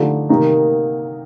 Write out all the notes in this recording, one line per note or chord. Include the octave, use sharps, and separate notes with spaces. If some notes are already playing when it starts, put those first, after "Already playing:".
Already playing: D3 F3 A3 D#4 G4
C3 D#3 A#3 D#4 A#4